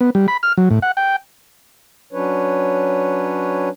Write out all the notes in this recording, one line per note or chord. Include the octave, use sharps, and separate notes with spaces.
B3
G3
B5
F6
F#3
A2
F#5
G5
F#3 C#4 D4 B4 C#5